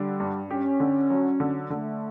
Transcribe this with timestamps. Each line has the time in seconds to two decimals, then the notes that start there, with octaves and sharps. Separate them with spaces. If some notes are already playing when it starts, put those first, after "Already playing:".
Already playing: D3 G3 D4
0.20 G2
0.50 C#4 G4
0.80 D3
1.10 F#3
1.40 D3
1.70 D3 A3